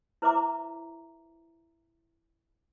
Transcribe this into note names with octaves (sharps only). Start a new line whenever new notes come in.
E4 B4 C5 E5 A#5 D6